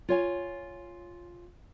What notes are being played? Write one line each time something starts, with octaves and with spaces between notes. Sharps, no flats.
F4 C#5 G#5